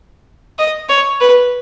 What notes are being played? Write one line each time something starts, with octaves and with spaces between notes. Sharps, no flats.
D#5
C#5
B4